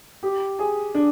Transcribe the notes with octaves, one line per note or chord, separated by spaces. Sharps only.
G4
G#4
D4